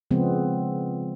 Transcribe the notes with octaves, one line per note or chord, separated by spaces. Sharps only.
C#3 F3 G#3 B3 C4